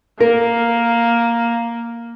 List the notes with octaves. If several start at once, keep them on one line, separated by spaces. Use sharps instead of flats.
A#3 A#4